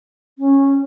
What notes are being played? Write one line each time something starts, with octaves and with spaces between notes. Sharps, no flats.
C#4